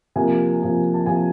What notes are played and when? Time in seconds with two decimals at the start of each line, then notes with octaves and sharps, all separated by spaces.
0.16 C3 F3 A#3 G#5
0.61 C3 F3 A#3
0.94 A5
1.06 C3 F3 A#3 G#5